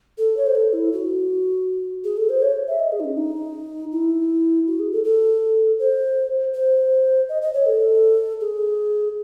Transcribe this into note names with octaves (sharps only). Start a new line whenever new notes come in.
A4
C#5
C5
A4
E4
F#4
G#4
A4
C5
C#5
E5
D#5
G#4
D#4
C#4
D#4
E4
F#4
G#4
A4
A4
C5
C5
D#5
D#5
C#5
A4
G#4